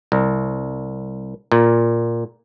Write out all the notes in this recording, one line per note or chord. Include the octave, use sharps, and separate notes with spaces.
C2
A#2